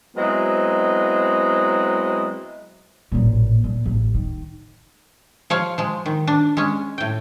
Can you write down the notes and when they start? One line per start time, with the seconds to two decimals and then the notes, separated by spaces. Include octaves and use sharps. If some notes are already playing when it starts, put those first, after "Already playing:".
0.17 F#3 G#3 B3 C4 E4 D#5
3.12 A1 A#2
3.64 A#2
3.85 A1
4.14 D#3
5.50 F3 C#5 F5
5.78 F3 G#3
6.06 D#3
6.27 D4
6.57 G#3 C#4
6.98 A2 G5